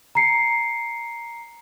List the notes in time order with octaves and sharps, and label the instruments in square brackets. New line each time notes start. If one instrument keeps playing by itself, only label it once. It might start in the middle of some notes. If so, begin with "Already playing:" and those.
[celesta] A#5 C7 C#7